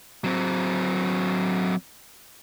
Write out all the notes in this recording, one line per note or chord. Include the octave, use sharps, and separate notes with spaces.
F#3 C4